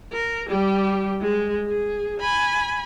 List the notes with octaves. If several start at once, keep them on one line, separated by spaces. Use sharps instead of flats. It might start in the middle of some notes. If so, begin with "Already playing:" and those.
A#4
G3 G4
G#3
G#4
G#5 B5